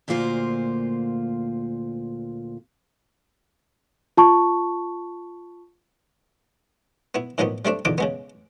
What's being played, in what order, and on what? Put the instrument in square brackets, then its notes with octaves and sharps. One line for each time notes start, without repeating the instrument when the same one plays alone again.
[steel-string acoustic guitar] D2 A#2 A#3 F4 C5
[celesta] F4 A5 C#6
[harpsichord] B3 E4
A2 D#3 F3 A#3 B3 D#4
G3 A3 C4 D4
E2 D3 D#4 F4 D6
C#3 G#3 B3